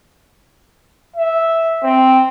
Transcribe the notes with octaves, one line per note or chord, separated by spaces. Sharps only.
E5
C4